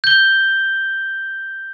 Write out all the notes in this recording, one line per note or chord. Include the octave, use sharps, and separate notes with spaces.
G6 G7